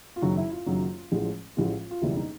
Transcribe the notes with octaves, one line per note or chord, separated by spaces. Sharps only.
F4
F#1 F#2 D#3 F#3 F#4
E4
F4
F#1 F#2 D#3 F#3
A1 A2 F3 G#3
A1 A2 F3 G#3 F4
F4
F#1 E2 B2 G3 B3 E4
D#4